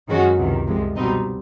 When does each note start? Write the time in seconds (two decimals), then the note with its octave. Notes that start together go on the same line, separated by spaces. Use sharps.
0.09 F#2 D#3 G#3 C#4 F#4
0.38 C#2 C3 D#3
0.67 C2 C3 F3 G#3
0.96 B2 G3 C4 D#4